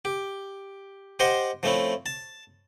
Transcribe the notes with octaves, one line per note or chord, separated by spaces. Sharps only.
G4
G4 C5 D#5 F#5 C6
F3 A3 C4 C#4 E4
A5